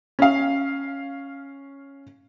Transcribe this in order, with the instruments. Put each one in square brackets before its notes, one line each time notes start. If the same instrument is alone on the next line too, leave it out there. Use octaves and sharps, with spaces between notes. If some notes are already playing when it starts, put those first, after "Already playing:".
[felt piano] C#4 F5